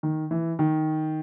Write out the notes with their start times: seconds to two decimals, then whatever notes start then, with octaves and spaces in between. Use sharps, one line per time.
0.03 D#3
0.31 E3
0.59 D#3